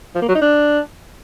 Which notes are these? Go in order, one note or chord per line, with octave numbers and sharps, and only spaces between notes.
F3
A#3
F#3
D#4
D4